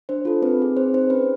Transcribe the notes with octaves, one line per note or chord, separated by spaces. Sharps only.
D4 C5
F4 A4
C4 B4
D#4 G#4
C4 C5
D#4 G#4 C5
C#4 B4